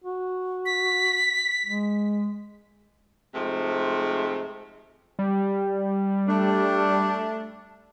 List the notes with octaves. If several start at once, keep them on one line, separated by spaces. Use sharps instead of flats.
F#4
B6
G#3
G#2 C3 F3 G#3 A3
G3
A3 D4